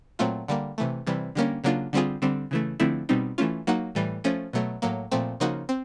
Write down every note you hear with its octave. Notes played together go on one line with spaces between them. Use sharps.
A#2 F#3 A3 C4 F4
D3 G3 A#3
C3 E3 A3
C3 E3 G3
D3 G3 A#3 C#4
C#3 F#3 A#3 D4 F4
D3 G3 C4 F4 G#4
D3 G3 C4
C#3 E3 A3
D3 F3 A3 C4 E4
B2 G3 C4 D#4
E3 A3 C#4 F4
F#3 A#3 D#4 F#4
A2 E3 G3
F3 A3 C#4
B2 F#3 A3
A2 F#3 A#3
A#2 F3 A3 C4
C#3 F3 A#3 D#4 F#4
C4